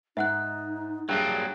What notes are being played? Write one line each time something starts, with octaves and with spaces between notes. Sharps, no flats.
G#2 D#4 E5 F#5 F#6
G2 F#3 A#3 D4 G#4 E5 F#6